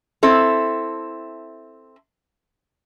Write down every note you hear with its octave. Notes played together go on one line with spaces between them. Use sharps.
C4 E4 A4